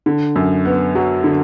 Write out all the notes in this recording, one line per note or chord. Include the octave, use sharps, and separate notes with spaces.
D3
F#2
B3
F#3
D3